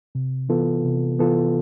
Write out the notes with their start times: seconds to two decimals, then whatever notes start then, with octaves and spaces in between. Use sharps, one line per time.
0.15 C3
0.49 E3 B3 F4 A4
0.84 C3
1.19 E3 B3 F4 A4